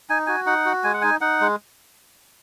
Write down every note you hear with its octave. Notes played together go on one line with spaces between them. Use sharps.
D#4 G#5
F#4 G#5
D#4 F#5
F#4
G#3 G#5
F#5
D#4 G#5
D#4 F#5
G#3